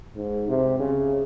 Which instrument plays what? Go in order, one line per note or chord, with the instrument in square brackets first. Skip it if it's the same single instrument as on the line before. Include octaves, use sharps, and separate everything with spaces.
[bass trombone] G#2
C3
C#3